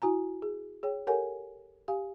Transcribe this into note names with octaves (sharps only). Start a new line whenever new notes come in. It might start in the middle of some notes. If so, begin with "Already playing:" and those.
E4 F#4 G#5 A#5
G#4
G#4 C#5 G5
G4 A4 A#4 C#5 F#5 G#5
G4 F5 G#5